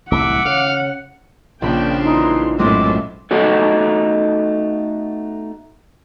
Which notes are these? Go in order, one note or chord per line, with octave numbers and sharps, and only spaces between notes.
D1 C2 E3 E5 F#5 D6
C#3 F5
A#1 C#3 A#3 D4 F4 G5 B5
E3 G#3 D#4 C6
F#2 A2 G#3 C4 F#4 G#4 E5 D6
A3 B3 D#4 F#4 A4